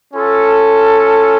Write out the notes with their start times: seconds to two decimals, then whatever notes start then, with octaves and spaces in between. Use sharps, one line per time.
0.14 C#4 F4 A4